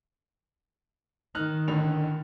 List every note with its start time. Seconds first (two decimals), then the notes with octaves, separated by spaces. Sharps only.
1.35 D#3 D#4 F6 F#6
1.68 A1 D3 F7